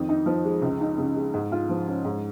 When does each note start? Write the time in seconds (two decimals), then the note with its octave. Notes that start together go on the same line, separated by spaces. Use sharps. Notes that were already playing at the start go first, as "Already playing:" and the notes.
Already playing: F2 D#3
0.09 D#4
0.26 F3
0.45 G#3
0.62 C#2
0.81 D#4
0.98 C#3
1.16 G#3
1.34 G#2
1.52 F4
1.69 F3
1.87 C#4
2.04 G#2